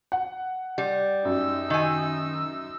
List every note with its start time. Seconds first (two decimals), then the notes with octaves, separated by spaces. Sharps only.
0.12 F#5
0.78 G3
1.25 F#2 D#4 E6
1.70 D#3 G#5